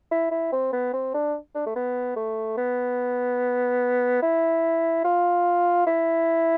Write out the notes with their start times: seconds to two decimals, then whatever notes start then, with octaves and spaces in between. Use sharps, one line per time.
0.11 E4
0.31 E4
0.52 C4
0.73 B3
0.93 C4
1.14 D4
1.55 D4
1.66 A3
1.76 B3
2.16 A3
2.58 B3
4.23 E4
5.05 F4
5.87 E4